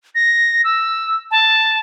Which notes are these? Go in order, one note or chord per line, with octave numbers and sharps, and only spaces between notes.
A#6
E6
A5